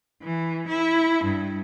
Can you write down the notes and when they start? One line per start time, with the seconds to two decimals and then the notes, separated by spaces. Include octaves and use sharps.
0.23 E3
0.68 E4
1.24 G2